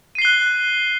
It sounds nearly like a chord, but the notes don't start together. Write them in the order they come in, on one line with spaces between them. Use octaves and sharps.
D#7 C7 G7 F#6